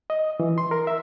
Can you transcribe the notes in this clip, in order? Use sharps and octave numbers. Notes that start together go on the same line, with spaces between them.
D#5
E3
C6
A#4
E5